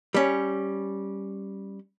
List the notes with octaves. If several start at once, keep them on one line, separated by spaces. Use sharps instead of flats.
G3 C#4